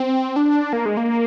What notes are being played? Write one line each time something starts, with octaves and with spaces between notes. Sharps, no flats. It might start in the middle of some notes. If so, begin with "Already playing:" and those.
Already playing: C4
D4
A#3
G#3
A#3